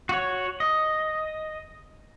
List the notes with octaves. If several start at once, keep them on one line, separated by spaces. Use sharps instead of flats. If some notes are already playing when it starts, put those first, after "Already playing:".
F#4 C#5
D#5